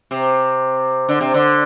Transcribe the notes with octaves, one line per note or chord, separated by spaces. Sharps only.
C3
D3
C3
D3